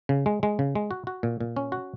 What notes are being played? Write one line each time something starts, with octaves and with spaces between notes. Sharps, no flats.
C#3
G#3
G#3
C#3
G#3
F#4
F#4
A#2
A#2
C#4
F#4